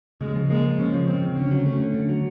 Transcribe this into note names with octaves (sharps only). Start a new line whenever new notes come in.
C#3 G#3
F3
G#3 A#3
F3
C#3 C#4
F3
C#3 C4
C#3
D3 C#4
F#3
A3
D3
D3
F#3